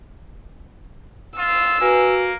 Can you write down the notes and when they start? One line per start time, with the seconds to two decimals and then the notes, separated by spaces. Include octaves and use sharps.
1.37 F4 E6
1.81 A#3 F#4 B4 G#5